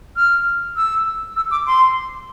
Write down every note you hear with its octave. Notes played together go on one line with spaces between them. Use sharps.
F6
E6
E6
D6
C6